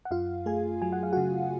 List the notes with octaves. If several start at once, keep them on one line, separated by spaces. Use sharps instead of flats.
F#5
F#2 F4 F5
A3 G#4 G#5
F#3 G#5
F#5
F5
C#3 F#4 F#5